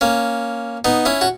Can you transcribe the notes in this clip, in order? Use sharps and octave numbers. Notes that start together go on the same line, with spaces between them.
A#3 C#4
B3 D#4
C#4 E4
F#4